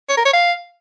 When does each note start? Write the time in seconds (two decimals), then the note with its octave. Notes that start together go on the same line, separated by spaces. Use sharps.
0.09 C#5
0.17 A#4
0.25 C#5
0.33 F5